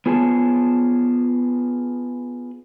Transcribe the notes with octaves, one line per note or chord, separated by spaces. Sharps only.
B3 F4 G#4 C#5 A5